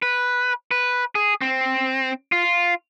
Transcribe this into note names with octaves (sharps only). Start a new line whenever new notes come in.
B4
B4
G#4
C4
F4